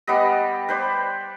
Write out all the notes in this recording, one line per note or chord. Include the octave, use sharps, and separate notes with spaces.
G3 B3 B4 D#5
B4 C5 D5